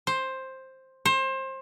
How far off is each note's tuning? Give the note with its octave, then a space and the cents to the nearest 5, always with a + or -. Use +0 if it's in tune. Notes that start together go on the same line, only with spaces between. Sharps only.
C5 +10
C5 +25